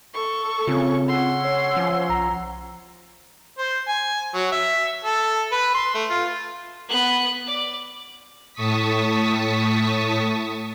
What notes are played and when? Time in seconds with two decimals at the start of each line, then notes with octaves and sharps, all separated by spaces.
0.14 A4 C#6
0.67 C#3 C4 C#4 F4
1.08 C#4 F#5 C6 E6
1.45 C#5
1.77 F3
2.09 B1 A#5
3.58 C5
3.88 G#5
4.34 F#3
4.52 E5
5.05 A4
5.52 B4
5.75 C6
5.95 A3
6.11 F4
6.89 B3 F#6
7.46 D5
8.54 A2 A5 C#6 D#6 B6